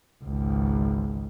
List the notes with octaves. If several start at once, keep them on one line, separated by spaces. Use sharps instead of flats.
G#1 C#2